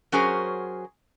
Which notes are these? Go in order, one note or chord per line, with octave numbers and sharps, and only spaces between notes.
F#3 C#4 F#4 G#4 A#4 C5